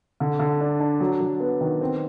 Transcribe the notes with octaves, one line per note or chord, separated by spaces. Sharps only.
D3
D3
D4
D4
F#3
F#3
B3
D#3
C4